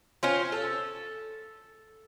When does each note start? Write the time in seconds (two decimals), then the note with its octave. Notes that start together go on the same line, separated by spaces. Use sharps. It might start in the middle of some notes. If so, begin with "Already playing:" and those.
0.23 C#4 F4 C5
0.52 A4